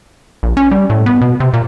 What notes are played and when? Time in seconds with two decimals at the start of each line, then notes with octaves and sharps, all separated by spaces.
0.43 A#1
0.57 C#4
0.71 G3
0.90 A2
1.06 B3
1.21 B2
1.40 C3
1.53 A#2